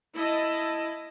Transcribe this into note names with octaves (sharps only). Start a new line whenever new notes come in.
E4 D#5 A5